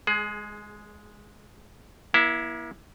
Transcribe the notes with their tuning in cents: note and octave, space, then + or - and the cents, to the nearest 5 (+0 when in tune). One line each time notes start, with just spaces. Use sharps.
G#3 +0 G#4 +25
A#3 +40 E4 +0